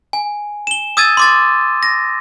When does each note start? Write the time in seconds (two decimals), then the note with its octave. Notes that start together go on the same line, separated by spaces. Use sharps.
0.13 G#5
0.67 E7 G7
0.97 D#6 E6 G#6 A6 D#7
1.17 C6 D6 A6
1.83 A#6